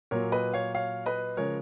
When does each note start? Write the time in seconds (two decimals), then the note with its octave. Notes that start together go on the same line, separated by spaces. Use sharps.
0.11 A#2 F#3 A#3 A#4 C#5
0.32 B4 D#5
0.53 C#5 F5
0.75 C#5 F5
1.06 B4 D#5
1.37 C#3 F3 G#3 A#4 C#5